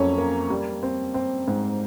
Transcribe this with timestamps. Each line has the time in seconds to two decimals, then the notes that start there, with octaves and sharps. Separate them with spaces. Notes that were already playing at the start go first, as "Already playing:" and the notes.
Already playing: F2 F#3 A#3 C#4 C#5
0.18 A#3
0.50 G3
0.83 C4
1.14 C4
1.48 G#2